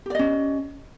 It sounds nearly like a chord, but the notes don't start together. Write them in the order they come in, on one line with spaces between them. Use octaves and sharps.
G4 D5 D#5 C#4